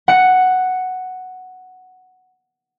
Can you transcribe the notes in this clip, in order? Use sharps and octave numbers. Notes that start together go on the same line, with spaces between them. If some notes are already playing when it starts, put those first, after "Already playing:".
F#5 C#7